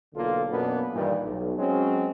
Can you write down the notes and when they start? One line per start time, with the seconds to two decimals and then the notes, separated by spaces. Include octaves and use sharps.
0.14 B1 D3 A#3 F4 A4
0.51 F#2 B2 A#3 B3 D4
0.94 G2 A#2 D#3 E3 G3
1.25 B1
1.58 F#3 G#3 C4 C#4